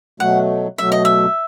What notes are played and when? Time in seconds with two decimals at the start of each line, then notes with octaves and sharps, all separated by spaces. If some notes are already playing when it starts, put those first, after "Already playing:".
0.20 B2 F#3 A3 F#5
0.78 B2 F#3 A3 E5
0.92 D#5
1.05 E5